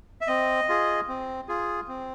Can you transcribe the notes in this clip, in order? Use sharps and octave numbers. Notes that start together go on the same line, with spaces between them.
E5
C4 D#5
F4 G#4
C4
F4 G#4
C4